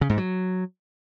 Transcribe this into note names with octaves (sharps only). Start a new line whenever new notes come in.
C#3
G#2
F#3